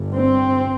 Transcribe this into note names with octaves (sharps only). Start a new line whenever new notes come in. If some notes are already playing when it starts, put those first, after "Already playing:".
Already playing: G1 G2
C4